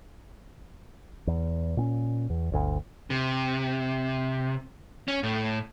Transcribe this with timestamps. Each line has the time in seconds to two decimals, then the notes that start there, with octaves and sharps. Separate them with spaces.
1.27 E2
1.77 A#2 C4 C#4
2.30 E2
2.52 G1 D2
3.10 C3
5.08 C#4
5.23 A2